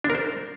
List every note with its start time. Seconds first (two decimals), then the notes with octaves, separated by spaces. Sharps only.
0.04 D4
0.10 A#4
0.15 C5